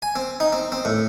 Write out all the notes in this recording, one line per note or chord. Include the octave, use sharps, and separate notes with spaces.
G#5
C4
D#4
C4
C4
A2